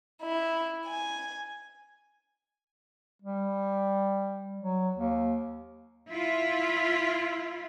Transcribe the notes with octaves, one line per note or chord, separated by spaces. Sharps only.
E4
G#5
G3
F#3
D#2
E4 F4